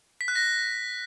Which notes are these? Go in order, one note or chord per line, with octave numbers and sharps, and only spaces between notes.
B6
F#6
A#6